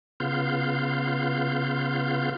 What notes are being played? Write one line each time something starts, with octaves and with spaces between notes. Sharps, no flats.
C#3 B3 F4 F5 G6